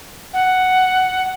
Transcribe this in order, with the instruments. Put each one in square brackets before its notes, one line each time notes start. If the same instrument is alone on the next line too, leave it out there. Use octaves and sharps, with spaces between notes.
[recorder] F#5